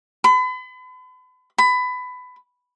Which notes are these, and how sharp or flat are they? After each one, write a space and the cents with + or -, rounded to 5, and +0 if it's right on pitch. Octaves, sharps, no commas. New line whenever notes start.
B5 +40
B5 +20